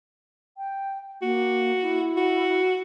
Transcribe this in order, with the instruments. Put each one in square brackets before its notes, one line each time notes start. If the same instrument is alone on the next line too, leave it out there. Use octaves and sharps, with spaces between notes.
[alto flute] G5
[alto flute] A#3 [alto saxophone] F#4
[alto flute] E4
[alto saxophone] F#4